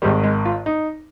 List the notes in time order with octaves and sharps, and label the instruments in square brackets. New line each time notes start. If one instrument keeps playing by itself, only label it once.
[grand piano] G#1 G#2 D#3 G3
G#3
F4
D#4